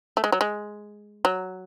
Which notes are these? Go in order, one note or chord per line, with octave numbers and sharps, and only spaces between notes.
A3
G#3
F#3
G#3
F#3